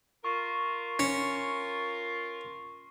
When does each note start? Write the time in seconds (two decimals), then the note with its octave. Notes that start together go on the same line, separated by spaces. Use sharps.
0.24 F4 A#4 C#6
0.99 C#4